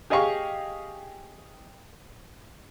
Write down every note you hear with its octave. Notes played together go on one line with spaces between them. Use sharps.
G4 G#4 D#5 F5 C#6